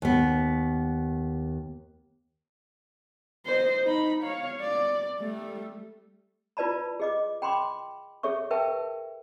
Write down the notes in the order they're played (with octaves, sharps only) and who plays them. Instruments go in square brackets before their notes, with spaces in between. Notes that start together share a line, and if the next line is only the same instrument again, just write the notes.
[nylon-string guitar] D#2 B3
[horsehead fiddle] C5 D#5
D#4 B5
C#5 F5
D5
G3 A3
[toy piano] E4 F4 B4 D5 A5 B5
G#4 D#5 D6
G5 B5 C6 D6
G#4 A4 C#5 E5 C#6
A#4 B4 E5 G5 A5